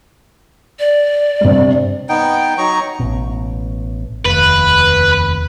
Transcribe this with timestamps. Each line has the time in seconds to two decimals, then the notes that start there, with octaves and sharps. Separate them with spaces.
0.79 D5
1.41 G2 C3
2.09 B3 D#4 G5
2.58 F#3 D#4 A#5 C#6
3.00 A1 B2
4.26 F1 D#2 B4